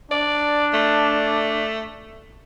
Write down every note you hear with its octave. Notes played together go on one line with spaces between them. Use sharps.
D4 D5
A3